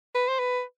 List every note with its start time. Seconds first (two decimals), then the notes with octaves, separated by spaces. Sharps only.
0.15 B4
0.29 C5
0.40 B4